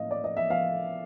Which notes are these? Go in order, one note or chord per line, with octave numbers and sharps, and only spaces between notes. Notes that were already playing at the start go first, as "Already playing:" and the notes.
Already playing: A2 A#3 C#4 D#5 F5
D5
D#5
E5
F5